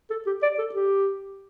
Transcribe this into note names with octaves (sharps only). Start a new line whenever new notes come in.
A4
G4
D5
A4
G4